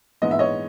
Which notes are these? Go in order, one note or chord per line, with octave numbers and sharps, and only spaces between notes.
A#1 G#2 E3 G#3 B3 D#5
E5
C#5 D#5